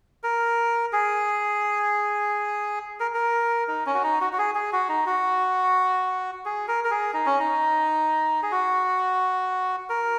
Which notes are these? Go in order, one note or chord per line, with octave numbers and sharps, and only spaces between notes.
A#4
G#4
A#4
A#4
D#4
C#4
F#4
D#4
F#4
F#4
G#4
G#4
F#4
D#4
F#4
G#4
A#4
A#4
G#4
D#4
C#4
D#4
G#4
F#4
A#4